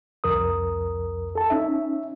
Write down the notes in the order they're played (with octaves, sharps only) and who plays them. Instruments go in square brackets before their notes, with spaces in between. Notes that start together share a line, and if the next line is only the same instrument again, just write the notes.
[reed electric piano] C2 F2 A#4 D#6
A4 A5
C#4 D#4 E5